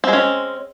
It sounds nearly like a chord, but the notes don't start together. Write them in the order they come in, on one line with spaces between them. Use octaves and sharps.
C4 G#3 C#4